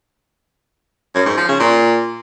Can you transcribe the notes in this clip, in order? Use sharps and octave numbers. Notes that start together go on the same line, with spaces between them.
F#2
G#2
F3
C#3
A#2